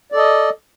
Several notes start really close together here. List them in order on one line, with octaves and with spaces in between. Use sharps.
D5 A4 D#5